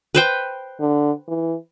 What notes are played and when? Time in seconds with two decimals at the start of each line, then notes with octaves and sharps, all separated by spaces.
0.15 B4 C5 G5
0.80 D3
1.28 E3